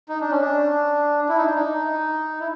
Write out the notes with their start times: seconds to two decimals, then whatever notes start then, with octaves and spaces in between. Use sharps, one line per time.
0.09 D#4
0.20 D4
0.30 C#4
0.42 D4
1.29 E4
1.37 D#4
1.46 D4
1.55 D#4
2.40 E4